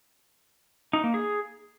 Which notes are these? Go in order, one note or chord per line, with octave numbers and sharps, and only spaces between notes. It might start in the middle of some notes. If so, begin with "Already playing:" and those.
D#4
A#3
G#4